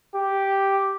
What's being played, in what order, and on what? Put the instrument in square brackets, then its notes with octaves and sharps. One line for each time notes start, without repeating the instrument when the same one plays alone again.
[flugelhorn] G4